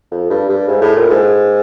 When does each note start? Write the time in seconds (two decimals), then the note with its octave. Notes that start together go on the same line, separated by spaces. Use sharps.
0.11 F2
0.30 G2
0.49 G2
0.68 G#2
0.81 A2
0.96 A#2
1.10 G#2